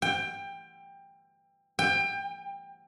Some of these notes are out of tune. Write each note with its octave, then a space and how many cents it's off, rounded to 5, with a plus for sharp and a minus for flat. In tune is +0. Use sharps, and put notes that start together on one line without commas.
G5 +20
G5 +25